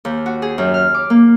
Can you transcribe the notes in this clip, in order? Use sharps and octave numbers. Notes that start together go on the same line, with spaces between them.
D#2
F#4
G#4
F#2
F6
D6
A#3